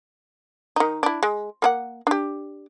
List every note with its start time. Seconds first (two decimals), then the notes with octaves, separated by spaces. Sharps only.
0.76 D#3 D#4
1.03 D4 E4
1.23 G#3
1.62 A#3 G#4 F#5
2.07 D4 G4